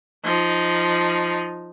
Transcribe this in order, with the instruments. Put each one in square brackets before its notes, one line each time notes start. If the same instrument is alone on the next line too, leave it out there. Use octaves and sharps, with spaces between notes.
[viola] F3 D#4